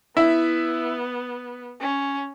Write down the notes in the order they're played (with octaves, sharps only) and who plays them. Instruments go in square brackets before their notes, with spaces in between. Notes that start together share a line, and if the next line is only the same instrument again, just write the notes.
[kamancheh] B3 [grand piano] E4 E5
[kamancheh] C#4